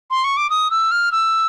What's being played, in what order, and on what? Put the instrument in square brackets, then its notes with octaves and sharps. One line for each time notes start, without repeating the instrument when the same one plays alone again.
[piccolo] C6
C#6
D6
D#6
E6
F6
E6